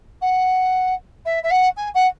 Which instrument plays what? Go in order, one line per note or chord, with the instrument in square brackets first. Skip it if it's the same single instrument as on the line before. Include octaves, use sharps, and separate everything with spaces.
[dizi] F#5
E5
E5
F#5
G#5
F#5